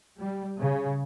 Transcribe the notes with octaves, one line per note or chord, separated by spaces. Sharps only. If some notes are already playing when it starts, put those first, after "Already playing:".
G3
C#3